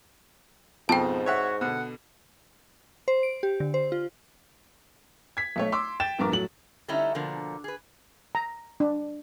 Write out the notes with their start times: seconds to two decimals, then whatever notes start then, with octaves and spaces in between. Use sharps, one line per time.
0.89 F2 G#2 B2 F3 G5 A5
1.26 F#4 C#5 E5 F#5
1.61 B2 D3 F#5
3.08 C5
3.23 D7
3.43 G4
3.60 D3
3.74 C5
3.92 F4
5.37 G#6 B6
5.56 B1 A3 C#5
5.72 C6 D6 E6
6.00 G5 A6 E7
6.19 A#1 G2 B3 A#4 D6
6.31 A2 F#3 F#7
6.88 D3 G3 A3 C#4 D#4 E4
7.15 B2 D3 F3 A#3
7.64 G#4 B4
8.35 A#5
8.80 D4